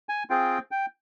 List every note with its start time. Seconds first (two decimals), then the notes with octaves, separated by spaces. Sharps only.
0.09 G#5
0.30 C4 F4 G#4 G5
0.71 G5